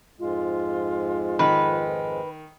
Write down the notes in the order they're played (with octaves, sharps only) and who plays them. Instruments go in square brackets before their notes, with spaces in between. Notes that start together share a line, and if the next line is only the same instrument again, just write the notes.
[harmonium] F2 G#2 G#3 [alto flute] F4
[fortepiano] D#3 [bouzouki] B4